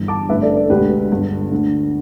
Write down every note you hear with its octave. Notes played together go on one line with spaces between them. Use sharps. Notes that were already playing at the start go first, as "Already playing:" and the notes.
Already playing: G1 G2 E3
A5 D6
A1 G2 D3 B4 E5
A4 D5
A4 D5
E1 D2 D3 G4 B4
G1 G2 D3
D2 D3